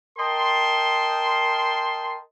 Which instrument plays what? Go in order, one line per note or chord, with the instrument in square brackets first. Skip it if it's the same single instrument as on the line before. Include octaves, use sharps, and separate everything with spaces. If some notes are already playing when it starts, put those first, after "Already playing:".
[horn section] A#4 D#5 G5 A5 C6